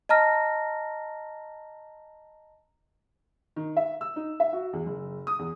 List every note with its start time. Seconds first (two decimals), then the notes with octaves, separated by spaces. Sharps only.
0.09 D#5 A5 A#5 F6 A#6
3.56 D#3
3.77 E5
4.01 E6
4.16 D#4
4.40 E5
4.53 F#4
4.73 E2
4.86 F#1
5.27 D#6
5.39 E2